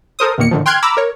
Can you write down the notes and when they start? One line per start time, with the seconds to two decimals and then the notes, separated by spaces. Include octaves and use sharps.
0.19 A4 A#4 C5 D#6
0.38 E2 A#2 D#3 A#3 C#7
0.51 A2 D3 D#3 F3
0.66 G5 C6 F6 F#6 G#6
0.82 A#5 B5 D6 E6
0.97 A#4 C#5